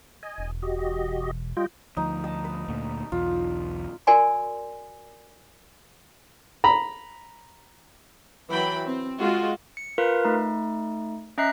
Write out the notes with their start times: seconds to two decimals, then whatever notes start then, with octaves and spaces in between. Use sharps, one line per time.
0.23 D#5 G#5
0.38 E1
0.62 F#4 G4 D#5
1.57 G3 F4 D#5 G5
1.97 D2 F3 D#4
2.24 D#5 A5
2.45 B4
2.68 D2 A#2
3.12 B1 E2 F4
4.07 F#4 A#4 D5 G#5 C6
6.64 A#5 B5
8.48 E3 F#3 G5 B5
8.85 C4
9.19 G#3 F4 F#4
9.77 C#7
9.98 F4 A#4 B4 F5
10.25 A3 D#4
11.38 C#4 D#5 E5 A#5 F#6 C7